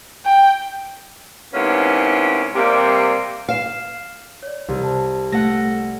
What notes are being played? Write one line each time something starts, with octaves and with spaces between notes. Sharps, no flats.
G5
G#2 C3 A#3 B3 C#4 E4
C3 G3 A#3
F5 F6 C7 E7
C#5 D5
C2
C5 A5
A3 F#5 A#6